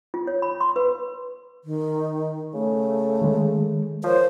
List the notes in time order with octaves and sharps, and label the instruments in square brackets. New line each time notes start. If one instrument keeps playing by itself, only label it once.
[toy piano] F4
C#5
B5
C6
B4
[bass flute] D#3
[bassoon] C#3 [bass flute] A3
[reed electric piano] D#3 G#3
[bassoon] F3 [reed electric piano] A#4 C#5 [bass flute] C5